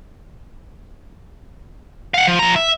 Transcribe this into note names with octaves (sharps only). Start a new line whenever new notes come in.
F5 F#5
F3
F3 A#5
E5